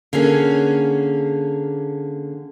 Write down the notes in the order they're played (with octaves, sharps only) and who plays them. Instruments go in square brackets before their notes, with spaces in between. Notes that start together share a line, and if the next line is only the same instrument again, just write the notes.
[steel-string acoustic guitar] D3 A#3 C#4 G#4